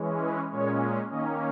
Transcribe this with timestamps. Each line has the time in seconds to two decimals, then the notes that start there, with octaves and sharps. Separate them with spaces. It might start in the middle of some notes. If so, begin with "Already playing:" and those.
Already playing: E3 G#3 C#4
0.21 B4
0.51 A#2 G#3 C#4 C#5
1.11 D#3 A#3 C#4 D#5